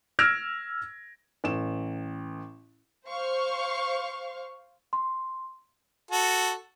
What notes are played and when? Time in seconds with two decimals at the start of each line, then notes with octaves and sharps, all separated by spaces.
0.19 E6 F6 G#6 A#6 D7
1.44 A1 E7
3.08 C5 F5 C#6
4.93 C6
6.11 F#4 A4